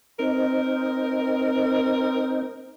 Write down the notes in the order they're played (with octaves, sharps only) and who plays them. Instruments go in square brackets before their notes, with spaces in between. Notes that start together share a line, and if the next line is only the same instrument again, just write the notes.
[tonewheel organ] C4 D#4 [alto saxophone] A#4